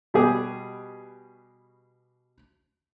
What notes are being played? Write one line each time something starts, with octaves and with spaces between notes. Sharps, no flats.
B2 G3 G4 G#4